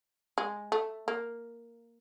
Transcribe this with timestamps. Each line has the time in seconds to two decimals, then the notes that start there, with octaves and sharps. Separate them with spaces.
0.38 G#3
0.72 A3
1.08 A#3